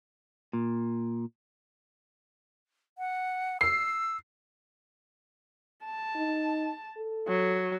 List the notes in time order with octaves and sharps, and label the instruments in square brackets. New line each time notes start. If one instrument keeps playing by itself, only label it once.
[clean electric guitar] A#2
[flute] F#5
[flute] E6 [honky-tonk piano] C7
[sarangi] A5
[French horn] D#4
A4
[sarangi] F#3